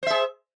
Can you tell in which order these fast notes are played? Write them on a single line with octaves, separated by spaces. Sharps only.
C5 E5 G#4